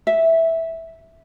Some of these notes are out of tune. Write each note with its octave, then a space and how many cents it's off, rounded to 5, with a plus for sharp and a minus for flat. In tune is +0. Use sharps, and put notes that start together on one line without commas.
E5 -10